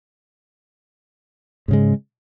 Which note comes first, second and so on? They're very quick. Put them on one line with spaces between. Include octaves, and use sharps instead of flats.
G#2 C#3 G#3